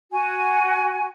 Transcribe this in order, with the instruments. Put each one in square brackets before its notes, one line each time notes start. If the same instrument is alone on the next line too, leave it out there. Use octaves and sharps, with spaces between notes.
[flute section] F#4 G#5